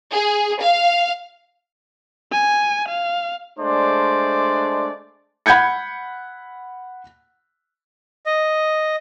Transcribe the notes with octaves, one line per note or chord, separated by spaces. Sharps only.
G#4
F5
G#5
F5
G#3 A3 D4 C5 D5
F#5 B5 G6 G#6 C#7
D#5